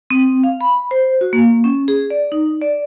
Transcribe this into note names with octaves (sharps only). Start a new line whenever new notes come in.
C4
F5
B5
C5
F#4
A#3
C#4
G#4
D5
D#4
D5